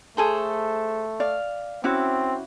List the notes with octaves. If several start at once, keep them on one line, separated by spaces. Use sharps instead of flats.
A3 G#4 A4 C5
D5 F5
C4 C#4 E4 F#4 D6